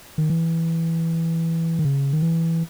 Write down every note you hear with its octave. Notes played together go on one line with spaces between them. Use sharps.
D#3
E3
D#3
C#3
D#3
E3